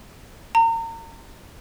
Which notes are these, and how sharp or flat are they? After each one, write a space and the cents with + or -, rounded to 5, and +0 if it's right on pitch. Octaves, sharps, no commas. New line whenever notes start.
A#5 -35